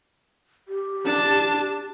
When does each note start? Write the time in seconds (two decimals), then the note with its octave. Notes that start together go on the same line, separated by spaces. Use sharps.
0.68 G4
1.05 D4 A5